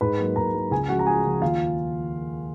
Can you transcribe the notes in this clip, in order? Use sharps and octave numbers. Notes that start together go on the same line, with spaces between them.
G#2 B4 B5
F#3 A#3
G#2 A#4 A#5
F#3 A#3
C#2 G#4 G#5
C#3 F3 G#3 F#4 F#5
A#5
C#2 G#4 G#5
C#3 F3 G#3
D#2 F4 F5